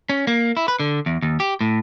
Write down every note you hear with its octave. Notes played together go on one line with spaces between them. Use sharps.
C#4
A#3
E4
B4
D3
E2
D#2
G4
A2